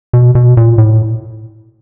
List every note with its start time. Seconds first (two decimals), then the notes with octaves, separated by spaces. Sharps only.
0.13 B2
0.35 B2
0.57 A#2
0.78 A2